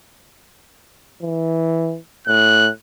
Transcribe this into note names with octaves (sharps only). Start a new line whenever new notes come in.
E3
A2 F#6